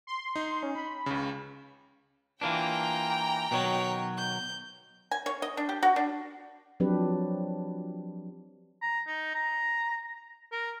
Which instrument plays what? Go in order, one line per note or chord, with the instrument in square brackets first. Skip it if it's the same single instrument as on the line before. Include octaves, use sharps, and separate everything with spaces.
[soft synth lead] C6
[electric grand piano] D#4
[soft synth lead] C#4
B5
[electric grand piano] C#2 C#3
[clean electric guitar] E3 A#3 D4 [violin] F4 [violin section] G5 A#5
[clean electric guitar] B2 D#3 F#3 [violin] C#5
[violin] G6
[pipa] G#5
C#5
D#5
D4
G4
F#4
D4
[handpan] F3 F#3 C4 D4 G4 B4
[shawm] A#5
D#4
A#5
A#4